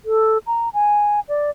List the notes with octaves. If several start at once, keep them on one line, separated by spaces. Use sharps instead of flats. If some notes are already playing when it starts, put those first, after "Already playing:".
A4
A#5
G#5
D5